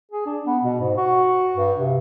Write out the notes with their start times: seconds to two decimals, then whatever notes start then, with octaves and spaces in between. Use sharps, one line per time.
0.11 G#4
0.26 D4
0.46 B3
0.63 B2
0.80 G#2
0.97 F#4
1.56 G2
1.78 C3